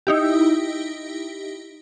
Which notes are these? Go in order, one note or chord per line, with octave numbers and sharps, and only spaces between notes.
D#4 E4 G4